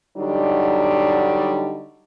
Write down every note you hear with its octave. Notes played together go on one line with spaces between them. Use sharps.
D3 F#3 G3 D4 D#4